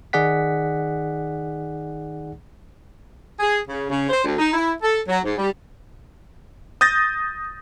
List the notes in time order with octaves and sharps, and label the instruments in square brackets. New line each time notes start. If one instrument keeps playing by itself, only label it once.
[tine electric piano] D#3 D#4 G#4 D5 F#5 B6
[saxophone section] G#4
C#3
C#3
C5
D2
D#4
E4
A4
F#3
G#2
G3
[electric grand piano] D#6 G6 A6 A#6